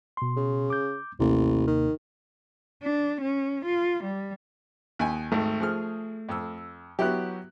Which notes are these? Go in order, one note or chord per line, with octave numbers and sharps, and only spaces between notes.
B2 C6
C#3
D6 G6
A1 D#2 C3 A#3
D#3
D4
C#4
F4
G3
D#2 G#5
G#1 A3
F3 G#4 F6
F2 E6
F#3 B3 E4 F#4 G4 F#6